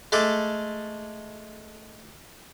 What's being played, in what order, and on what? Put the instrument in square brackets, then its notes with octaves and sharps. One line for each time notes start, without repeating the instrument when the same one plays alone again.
[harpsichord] G#3 A3 A4 D6